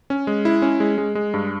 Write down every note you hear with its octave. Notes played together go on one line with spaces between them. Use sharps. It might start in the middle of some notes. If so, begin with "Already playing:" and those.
C#4
G#3
E4
C#4
G#3
G#3
G#3
G2